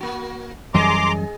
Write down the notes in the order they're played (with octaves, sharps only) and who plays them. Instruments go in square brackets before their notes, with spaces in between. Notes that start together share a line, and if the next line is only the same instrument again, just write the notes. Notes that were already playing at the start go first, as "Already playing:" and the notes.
[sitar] A#3 F#4
[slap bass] F#2 E3 G3 [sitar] G#4 D#5 [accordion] A#5 C6 D6